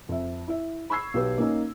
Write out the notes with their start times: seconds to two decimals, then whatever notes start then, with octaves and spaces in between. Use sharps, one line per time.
0.09 F2 E5
0.48 E4 E5
0.90 B5 C#6 E6 G#6 C7
1.14 B1 G4 B4
1.38 A#3 C#4 D#4